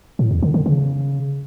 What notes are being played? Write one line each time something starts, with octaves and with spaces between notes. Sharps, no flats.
A2
E2
D3
D3
C#3